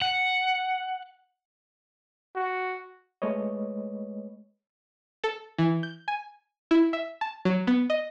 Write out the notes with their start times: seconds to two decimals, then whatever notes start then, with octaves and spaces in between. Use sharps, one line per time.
0.01 F#5
2.36 F#4
3.22 G#3 A3 B4 C#5 D#5
5.24 A4
5.58 E3
5.83 G6
6.08 G#5
6.71 E4
6.93 E5
7.21 A5
7.45 F#3
7.67 B3
7.90 D#5